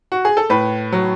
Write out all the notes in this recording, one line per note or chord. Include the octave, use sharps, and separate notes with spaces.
F#4
G#4
A4
A2 B4
F#3